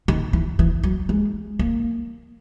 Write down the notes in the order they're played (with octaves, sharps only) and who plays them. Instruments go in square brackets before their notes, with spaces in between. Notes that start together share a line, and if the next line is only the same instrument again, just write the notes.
[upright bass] D#3
E3
E3
F#3
G#3
A#3